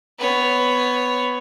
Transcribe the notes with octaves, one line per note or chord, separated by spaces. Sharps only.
B3 C#5